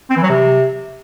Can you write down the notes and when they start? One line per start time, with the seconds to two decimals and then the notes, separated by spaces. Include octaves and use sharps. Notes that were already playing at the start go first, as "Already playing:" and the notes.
0.10 C4
0.17 E3
0.23 F#3
0.29 C3